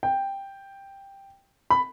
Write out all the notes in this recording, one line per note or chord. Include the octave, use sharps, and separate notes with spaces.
G5
B5